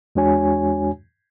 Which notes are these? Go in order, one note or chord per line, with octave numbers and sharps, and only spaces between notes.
E2 G#3 D4 F#4 C#5 G#5